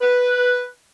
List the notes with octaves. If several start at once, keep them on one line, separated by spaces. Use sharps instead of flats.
B4